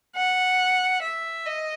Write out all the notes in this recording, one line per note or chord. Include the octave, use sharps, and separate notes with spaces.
F#5
E5
D#5